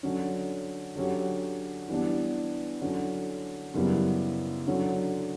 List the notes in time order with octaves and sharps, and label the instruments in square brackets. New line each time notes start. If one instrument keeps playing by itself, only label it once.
[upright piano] D3 F#3 C#4
D3 F#3 C#4 G4 C#5
E3 G3 B3 D4
D3 F#3 C#4
F#2 C#3 G3 B3 E4
D3 F#3 C#4